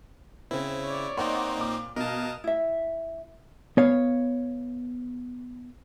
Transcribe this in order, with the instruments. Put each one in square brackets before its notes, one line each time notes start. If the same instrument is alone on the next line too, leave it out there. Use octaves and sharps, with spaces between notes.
[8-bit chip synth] C#3 E4 [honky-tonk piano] C4
[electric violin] C#5 D5
[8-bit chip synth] A#3 C4 D#4 [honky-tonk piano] D#5 F#5 C6
[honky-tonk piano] A#2 D6
[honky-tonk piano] B2 [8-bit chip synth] A#4 A5 [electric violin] D#5 F5
[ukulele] E4 E5
[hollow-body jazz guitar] B3 C#5 F5